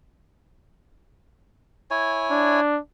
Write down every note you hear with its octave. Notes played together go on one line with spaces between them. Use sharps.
E4 C#5 G#5
D4